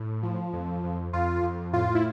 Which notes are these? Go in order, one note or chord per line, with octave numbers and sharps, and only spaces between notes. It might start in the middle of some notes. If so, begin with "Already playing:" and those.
Already playing: A2
F3
F2
F2
F2 F4
F2
A2 F4
E4